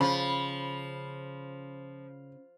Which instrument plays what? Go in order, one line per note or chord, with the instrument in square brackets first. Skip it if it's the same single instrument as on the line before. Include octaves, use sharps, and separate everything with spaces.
[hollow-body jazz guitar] C#3 [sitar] F3 [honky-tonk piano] B5